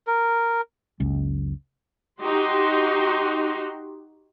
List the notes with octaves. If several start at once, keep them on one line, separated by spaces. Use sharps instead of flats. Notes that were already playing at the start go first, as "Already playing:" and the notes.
A#4
F#1 C#2 F#2
D#4 F#4 G4 C6